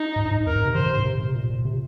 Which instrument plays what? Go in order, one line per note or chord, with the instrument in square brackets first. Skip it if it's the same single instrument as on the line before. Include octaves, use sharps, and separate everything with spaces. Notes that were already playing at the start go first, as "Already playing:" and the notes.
Already playing: [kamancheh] D#4
[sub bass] G#2
G#2
[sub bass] F2 [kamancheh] A#4
[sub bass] G#2
C3
[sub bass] D#3 [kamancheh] C5
[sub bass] C3
G#2
C3
C3
A#2
A#2
C3